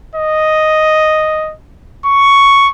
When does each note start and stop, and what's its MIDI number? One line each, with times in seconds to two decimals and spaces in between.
0.15 1.54 75
2.06 2.70 85